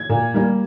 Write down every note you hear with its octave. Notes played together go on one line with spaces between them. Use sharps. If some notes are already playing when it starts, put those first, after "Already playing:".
Already playing: G#6
A#2
G3 A#3